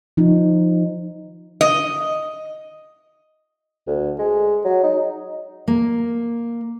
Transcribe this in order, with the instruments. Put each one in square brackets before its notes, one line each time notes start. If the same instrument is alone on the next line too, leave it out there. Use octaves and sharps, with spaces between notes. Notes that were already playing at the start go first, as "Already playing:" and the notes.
[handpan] F3 D#4
[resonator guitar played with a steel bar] D#5
[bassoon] D2
G#3
F#3
D#4
[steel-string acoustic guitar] A#3